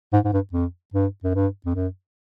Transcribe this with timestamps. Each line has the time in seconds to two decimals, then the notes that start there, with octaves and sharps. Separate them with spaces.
0.13 G#2
0.24 G#2
0.33 G2
0.53 F2
0.93 G2
1.23 F#2
1.34 G2
1.66 F2
1.75 F#2